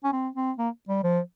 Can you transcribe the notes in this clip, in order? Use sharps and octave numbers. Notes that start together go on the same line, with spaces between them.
C#4
C4
C4
A#3
G3
F3